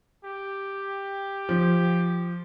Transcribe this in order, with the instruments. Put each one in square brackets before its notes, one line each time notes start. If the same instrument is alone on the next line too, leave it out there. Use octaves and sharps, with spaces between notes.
[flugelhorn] G4
[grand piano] F3